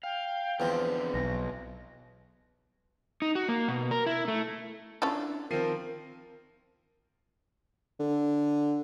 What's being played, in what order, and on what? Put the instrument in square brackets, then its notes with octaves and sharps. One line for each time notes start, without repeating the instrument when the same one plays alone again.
[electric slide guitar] F5 [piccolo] G5
[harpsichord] E2 F3 [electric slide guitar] D3 C4
[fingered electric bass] B1 [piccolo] A#6
[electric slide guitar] D#4
F#4
A#3
B2
A#4
E4
A3
[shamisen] C#4 F4 A4 [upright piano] D4 E4
[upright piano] D#3 C7 D#7 [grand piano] F3 C4 [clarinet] A#4
[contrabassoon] D3